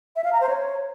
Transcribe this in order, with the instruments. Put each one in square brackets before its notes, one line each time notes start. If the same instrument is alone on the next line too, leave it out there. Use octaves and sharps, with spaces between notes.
[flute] E5
F5
A#5
C5
C#5